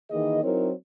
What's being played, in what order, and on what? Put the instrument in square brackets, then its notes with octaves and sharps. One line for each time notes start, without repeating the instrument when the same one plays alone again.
[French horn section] D#3 E3 A#3 G#4 D#5
F#3 C4 D#4 E4 A#4 C#5